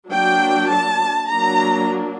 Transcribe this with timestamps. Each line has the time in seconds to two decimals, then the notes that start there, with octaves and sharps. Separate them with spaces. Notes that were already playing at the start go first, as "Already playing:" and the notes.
0.10 F#3 A#3 D4 G5
0.70 A5
1.30 F#3 A#3 D4 A#5